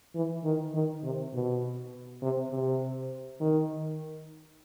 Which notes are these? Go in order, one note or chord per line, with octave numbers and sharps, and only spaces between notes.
E3
D#3
D#3
C3
B2
C3
C3
D#3